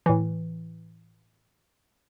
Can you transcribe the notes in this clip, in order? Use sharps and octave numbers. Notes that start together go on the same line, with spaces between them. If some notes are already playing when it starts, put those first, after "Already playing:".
A2 E3